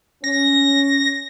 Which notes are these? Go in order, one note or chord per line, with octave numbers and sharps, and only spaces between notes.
C#4 A#6